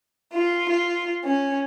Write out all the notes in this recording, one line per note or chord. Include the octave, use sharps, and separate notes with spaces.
F4
F4
C#4